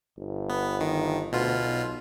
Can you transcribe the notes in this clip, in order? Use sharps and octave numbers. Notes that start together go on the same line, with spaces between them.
G1
B3
D#3
D2 B2 F4
B1